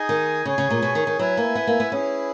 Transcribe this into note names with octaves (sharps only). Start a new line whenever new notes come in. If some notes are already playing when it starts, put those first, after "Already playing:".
Already playing: D#4 G#4 D#5 G#5
D#3
C#3 G#4 C#5 G#5
C#3
A#2
B2
D#3
D#3
F#3 E4 B4 E5 G#5
A#3
B3
A#3
B3
C#4 E4 G#4 B4